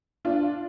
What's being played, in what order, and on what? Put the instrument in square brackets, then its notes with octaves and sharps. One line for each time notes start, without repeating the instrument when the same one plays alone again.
[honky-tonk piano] D4 F4